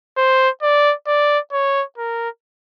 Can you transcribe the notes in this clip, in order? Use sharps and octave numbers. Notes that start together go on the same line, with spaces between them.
C5
D5
D5
C#5
A#4